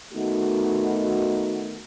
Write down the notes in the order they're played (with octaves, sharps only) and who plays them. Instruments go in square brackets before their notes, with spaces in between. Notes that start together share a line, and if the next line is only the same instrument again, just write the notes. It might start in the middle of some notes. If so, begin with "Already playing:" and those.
[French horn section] D#3 A3 B3 D#4 F#4